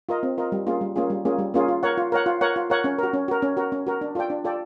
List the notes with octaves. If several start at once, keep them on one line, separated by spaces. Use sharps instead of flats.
F4 A#4 D#5
C4
F4 A#4 D#5
G3
A#3 C#4 F4 G#4
G3
A#3 C#4 F4 G#4
G3
A#3 C#4 F4 G#4
G3
A#3 C#4 F4 G#4
F4
A#4 C#5 F#5
F4
A#4 C#5 F#5
F4
A#4 C#5 F#5
F4
A#4 C#5 F#5
C#4
F#4 A#4
C#4
F#4 A#4
C#4
F#4 A#4
C#4
F#4 A#4
D4
F4 A4 D5 G5
D4
F4 A4 D5 G5